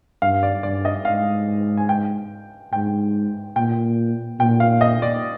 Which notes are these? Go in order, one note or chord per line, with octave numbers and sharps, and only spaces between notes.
G2 F5
D5
G2 D5
D#5
G#2 F5
G#5
G5
G#2 G5
A#2 G5
A#2 G5
F5
D#5
D5